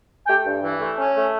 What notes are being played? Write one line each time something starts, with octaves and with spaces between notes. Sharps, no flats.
G#5
A3 G4 G5
G2
E3
A3
C#4
A3